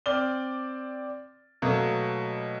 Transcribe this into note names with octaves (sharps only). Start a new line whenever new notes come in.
C4 D5 F6 G7
B2 F#3 A3 A#3